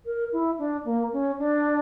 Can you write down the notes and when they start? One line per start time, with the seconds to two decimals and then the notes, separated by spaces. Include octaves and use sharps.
0.06 A#4
0.32 E4
0.59 D4
0.85 A#3
1.13 C#4
1.39 D4